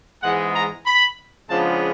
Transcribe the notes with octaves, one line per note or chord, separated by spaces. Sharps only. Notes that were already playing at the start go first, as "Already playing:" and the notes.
G#2 E3 G#3 B3 F#5
A#5
B5
C#3 F3 G#3 B3 D4 A5